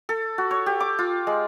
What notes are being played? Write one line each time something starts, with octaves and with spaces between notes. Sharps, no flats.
A4
F#4
C#5
G4
D6
F4
G#3